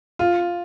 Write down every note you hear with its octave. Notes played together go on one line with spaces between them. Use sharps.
F4